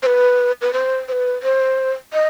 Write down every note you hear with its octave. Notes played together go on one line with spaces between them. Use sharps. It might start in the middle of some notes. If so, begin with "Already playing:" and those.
C5
B4
B4
C5
C5
B4
C5
D#5